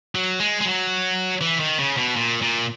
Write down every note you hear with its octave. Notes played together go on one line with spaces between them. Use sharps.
F#3
G#3
G#3
F#3
E3
D#3
C#3
B2
A#2
A#2